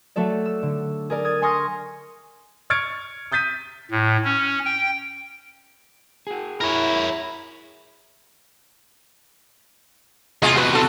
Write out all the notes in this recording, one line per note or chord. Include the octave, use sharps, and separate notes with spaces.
F#3 A3 F#4 A4 D5
E6
D3
G#4 A#4 D5
D#6 G#6 A6 D#7
G#5 C6 C#6 D#6 F6 A#6
C#6 F6 G#6 A6 C#7 D7
D#6 G6 A6 B6 D#7
A2
C#4
G5
F#4 G#4
E4 A#4 C#5
E2 C3 F4 G#4 D#5
F#4 B4
F#4 A4